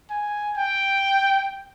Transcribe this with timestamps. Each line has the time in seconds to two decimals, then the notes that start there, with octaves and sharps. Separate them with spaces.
0.11 G#5
0.57 G5